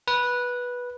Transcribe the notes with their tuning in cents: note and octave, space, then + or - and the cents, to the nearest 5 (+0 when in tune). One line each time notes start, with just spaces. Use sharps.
B4 -10